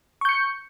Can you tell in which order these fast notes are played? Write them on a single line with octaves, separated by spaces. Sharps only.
C#6 G6 C#7